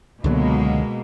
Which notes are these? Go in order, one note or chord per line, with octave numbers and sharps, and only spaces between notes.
C#2 B2 D3 F#3 G#3 A#3